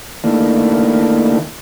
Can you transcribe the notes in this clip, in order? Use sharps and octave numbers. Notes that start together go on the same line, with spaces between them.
D#3 A3 A#3 D4 E4